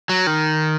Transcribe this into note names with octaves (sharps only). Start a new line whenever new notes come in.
F#3
D#3